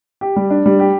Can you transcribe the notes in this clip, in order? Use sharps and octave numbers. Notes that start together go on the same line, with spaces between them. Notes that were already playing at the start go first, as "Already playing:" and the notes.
G4
G3
D4
G3
G4